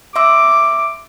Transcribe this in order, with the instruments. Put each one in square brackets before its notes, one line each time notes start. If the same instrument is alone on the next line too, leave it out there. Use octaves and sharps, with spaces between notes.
[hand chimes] E5 C6 E6 [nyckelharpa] D6